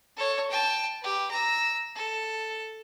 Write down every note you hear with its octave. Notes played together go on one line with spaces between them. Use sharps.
A4 C#5
G5 A5
G4 B4
A#5 E6
A4